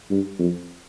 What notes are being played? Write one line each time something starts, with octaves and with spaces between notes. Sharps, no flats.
G2
F2